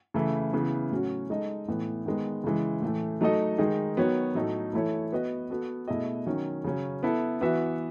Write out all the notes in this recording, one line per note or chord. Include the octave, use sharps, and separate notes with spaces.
C#3 E3 A3 E4
C#3 E3 B3
A2 F#3 C#4 F#4
G#3 D#4 A4 D#5
A2 E3 B3
D#3 G#3 B3
C#3 E3 G#3
A2 E3 A3
F#3 A3 D#4 A4 D#5
D#3 G#3 D#4 G#4
D#3 F#3 B3 F#4 C#5
A2 F#3 A3 D#4 A4
E3 A3 E4 A4 C#5
B3 F#4 B4 D#5
B3 F#4 A4
B2 A3 E4 G#4 D#5
D#3 F#3 C#4
C#3 F#3 C#4
B3 E4 A4
E3 B3 F#4 B4 E5